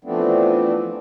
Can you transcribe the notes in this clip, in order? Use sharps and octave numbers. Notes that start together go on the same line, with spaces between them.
E3 F3 A3 B3 C4 D4